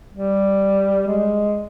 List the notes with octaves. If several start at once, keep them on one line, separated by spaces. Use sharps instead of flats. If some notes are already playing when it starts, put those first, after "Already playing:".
G3
G#3